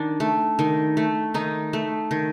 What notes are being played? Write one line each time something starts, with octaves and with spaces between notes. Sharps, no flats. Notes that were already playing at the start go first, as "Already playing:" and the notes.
Already playing: D#3 D4
A3
D#3
A3
D#3 D#4
A3
D#3